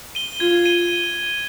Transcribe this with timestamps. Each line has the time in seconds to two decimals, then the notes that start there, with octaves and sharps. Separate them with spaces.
0.15 D#7 G7
0.40 F4 G#6
0.66 D#7 G7